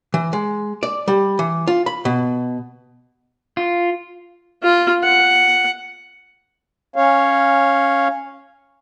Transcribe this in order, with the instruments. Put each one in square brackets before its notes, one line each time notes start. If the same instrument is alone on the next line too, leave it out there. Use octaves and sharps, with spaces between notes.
[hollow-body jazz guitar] E3
G#3
D5
G3
E3
F4
B5
B2
[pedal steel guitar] F4
[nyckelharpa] F4
F#5
[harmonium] C#4 C#5 F5